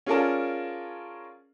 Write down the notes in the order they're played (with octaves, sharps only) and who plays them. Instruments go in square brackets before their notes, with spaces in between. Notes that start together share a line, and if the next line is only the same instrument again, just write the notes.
[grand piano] C#4 F4 G#4 A#4 D5 A5